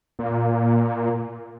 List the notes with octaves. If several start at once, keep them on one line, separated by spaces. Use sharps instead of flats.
A#2